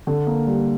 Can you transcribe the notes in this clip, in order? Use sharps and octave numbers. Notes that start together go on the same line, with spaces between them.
D3
A#3
G3